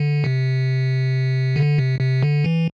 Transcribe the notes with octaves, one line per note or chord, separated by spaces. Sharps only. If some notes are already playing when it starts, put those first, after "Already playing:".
Already playing: D3
C3
D3
C3
C3
D3
E3